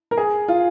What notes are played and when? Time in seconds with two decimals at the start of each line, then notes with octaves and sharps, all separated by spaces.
0.11 A#4
0.17 G#4
0.48 F4